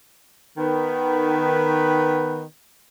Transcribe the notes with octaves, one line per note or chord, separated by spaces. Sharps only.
D#3 B3 B4